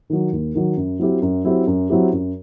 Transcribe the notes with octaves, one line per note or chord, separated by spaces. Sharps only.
D#3 F#3
D#2
D#3 F#3
F#2
F#3 C4 E4 G4
F#2
F#3 C4 E4 G4
F#2
F#3 C4 E4 G4
F#2